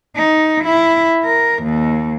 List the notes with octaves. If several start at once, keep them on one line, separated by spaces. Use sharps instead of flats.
D#4
E4
A#4
D#2